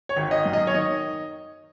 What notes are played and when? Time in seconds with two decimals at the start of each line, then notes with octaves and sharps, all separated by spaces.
0.09 C#5
0.16 G#1
0.31 D#5
0.45 F#2
0.53 D#5
0.67 C#5
0.75 D#3 D#5